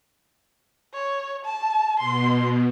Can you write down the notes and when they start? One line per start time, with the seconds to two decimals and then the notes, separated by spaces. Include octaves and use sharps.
0.94 C#5
1.45 A5
1.99 B2 C6